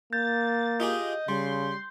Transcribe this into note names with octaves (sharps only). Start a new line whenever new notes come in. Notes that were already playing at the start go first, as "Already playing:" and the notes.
A#3 G6 A6
F4 G4 G#4 D#5
C#3 G3 C6